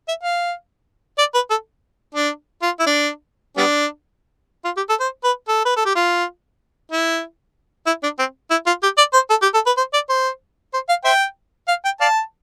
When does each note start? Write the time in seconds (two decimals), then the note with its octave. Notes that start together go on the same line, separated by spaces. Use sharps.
0.08 E5
0.23 F5
1.18 D5
1.34 B4
1.50 A4
2.15 D4
2.62 F4
2.79 E4
2.87 D4
3.57 G3 B3 D4
4.65 F4
4.77 G4
4.89 A4
5.00 C5
5.24 B4
5.48 A4
5.65 B4
5.76 A4
5.85 G4
5.95 F4
6.92 E4
7.86 E4
8.03 D4
8.19 C4
8.51 E4
8.66 F4
8.83 G4
8.98 D5
9.13 C5
9.30 A4
9.42 G4
9.54 A4
9.66 B4
9.77 C5
9.94 D5
10.09 C5
10.74 C5
10.89 F5
11.05 C5 E5 G5
11.68 F5
11.85 G5
12.01 D5 F5 A5